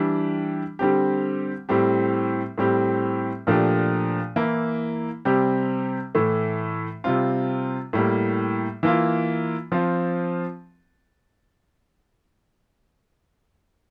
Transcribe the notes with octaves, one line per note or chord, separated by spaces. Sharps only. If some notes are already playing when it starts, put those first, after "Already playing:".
Already playing: E3 G3 D4
D3 G3 C4 G4
A2 G3 C4 G4
A2 G3 C4 G4
A#2 F3 A3 D4 G4
E3 A#3 E4
C3 G3 C4 G4
A2 E3 A3
C3 G3 C4 F4
A2 G3 A#3
E3 A#3 F4
F3 C4 F4